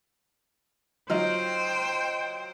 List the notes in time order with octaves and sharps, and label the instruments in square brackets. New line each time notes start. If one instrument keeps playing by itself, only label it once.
[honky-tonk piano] F#3 D#4 F4 [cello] C5 G5